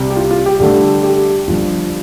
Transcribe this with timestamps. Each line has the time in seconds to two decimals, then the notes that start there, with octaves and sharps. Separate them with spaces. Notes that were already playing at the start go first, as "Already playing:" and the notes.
Already playing: C2 C3 G3
0.10 G4
0.17 F4
0.31 F4
0.46 G4
0.60 G2 D3 A3 G4
1.03 G4
1.47 G1 G2 F3 F4